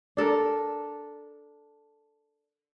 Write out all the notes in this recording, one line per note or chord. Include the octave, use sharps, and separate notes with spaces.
D4 A4 A#4